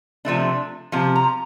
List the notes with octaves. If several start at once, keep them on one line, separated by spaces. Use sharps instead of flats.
C3 F3 A3 D4
C3 F3
A#5